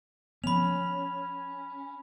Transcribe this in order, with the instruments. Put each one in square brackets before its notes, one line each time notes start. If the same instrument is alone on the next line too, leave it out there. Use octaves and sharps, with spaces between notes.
[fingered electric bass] F3 B3 [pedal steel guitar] C#4 [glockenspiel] B5 F7